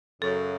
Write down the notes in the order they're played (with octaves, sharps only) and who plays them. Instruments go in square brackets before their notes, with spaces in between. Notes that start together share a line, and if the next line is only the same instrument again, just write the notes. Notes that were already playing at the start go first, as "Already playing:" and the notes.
[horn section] F#2 C#3 F#3 [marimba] A4